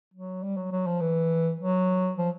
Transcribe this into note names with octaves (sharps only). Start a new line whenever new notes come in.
F#3
G3
F#3
F#3
F3
E3
F#3
F3